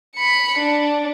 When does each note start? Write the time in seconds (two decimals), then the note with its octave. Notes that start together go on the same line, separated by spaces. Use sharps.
0.16 B5 C#7
0.59 D4